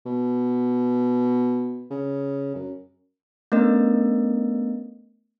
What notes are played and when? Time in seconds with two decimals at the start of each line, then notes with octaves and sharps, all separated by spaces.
0.06 B2
1.90 C#3
2.55 F#2
3.52 A3 B3 C#4 D4 A#4 D#5